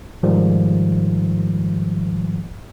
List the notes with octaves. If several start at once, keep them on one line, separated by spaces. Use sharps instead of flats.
G#2 D#3 F3 G3